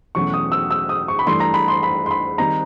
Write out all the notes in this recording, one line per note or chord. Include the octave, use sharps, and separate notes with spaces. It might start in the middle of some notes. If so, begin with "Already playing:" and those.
E2 B2 F#3 A3 C#4 C#6
D#6
E6
E6
D#6
C#6
B5
G2 E3 A3 D4 C6
A#5
B5
C6
B5
C6
B5
D#3 G3 C4 D#4 A#5